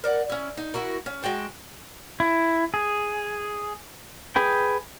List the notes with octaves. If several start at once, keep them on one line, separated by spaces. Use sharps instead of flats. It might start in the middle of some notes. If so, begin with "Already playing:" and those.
A#4 D5 F#5
C#4 E4
D#4
E4 F#4 A#4
C#4
G#3 F#4 G5 A5
E4
G#4
G#4 B4 G5